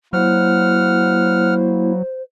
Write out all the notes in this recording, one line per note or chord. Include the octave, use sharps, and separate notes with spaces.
F#3 A#3 E4 C5 F#5 F6